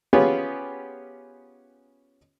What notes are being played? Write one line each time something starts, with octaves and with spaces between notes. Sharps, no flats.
B3 C#4 F4 G4 G#4 C#5